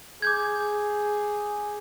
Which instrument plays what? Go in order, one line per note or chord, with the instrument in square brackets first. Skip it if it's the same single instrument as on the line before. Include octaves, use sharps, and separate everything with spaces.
[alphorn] G#4 [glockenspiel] D6 G6 G#6